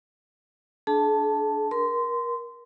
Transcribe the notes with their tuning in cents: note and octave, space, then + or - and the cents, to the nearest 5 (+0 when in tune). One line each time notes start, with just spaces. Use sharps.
D4 +0 G#4 +45 A5 +0
A#4 +25 C6 -20